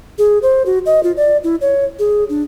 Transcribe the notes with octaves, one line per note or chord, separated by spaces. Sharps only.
G#4
C5
F#4
D#5
F4
D5
E4
C#5
G#4
D4